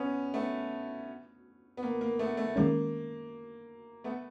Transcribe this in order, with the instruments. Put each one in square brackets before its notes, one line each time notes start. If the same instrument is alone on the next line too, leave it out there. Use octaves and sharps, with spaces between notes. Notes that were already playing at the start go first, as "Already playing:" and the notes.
Already playing: [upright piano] B3 C#4
A3 B3
B3
A#3
A#3
A3 B3
A3
[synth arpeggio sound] D#3 G#3 C#4 [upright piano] A#3
[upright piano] A3 B3